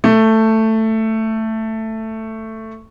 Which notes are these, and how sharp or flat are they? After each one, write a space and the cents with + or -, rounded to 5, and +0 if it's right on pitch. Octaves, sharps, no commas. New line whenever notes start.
A3 +10